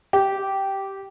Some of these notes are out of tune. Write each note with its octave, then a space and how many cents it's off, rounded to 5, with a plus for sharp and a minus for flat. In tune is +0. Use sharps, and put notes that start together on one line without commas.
G4 -10